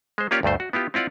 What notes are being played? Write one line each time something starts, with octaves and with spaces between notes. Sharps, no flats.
G#3 C5
A#3 C#4 F4 G4 C#5 D5
D2 G2 A3 C5
F#4
B3 E4 F4 G4
C4 E4 F4 D5 F#5